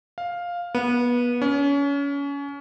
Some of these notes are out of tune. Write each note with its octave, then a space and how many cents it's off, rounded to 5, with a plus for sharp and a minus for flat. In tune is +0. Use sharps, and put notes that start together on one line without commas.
F5 +5
B3 -25
C#4 +30